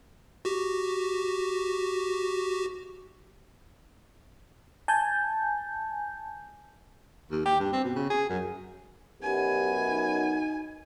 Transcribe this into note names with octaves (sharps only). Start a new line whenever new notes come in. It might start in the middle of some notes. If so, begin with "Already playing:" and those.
F#4 G4
G#5 A5 G6
D#2
G4
G2
C4
B2
C#3
G#4
F#2
B1 F#2 B3 G4 G#5
D#4